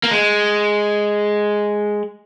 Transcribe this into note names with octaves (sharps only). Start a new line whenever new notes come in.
A#3
G#3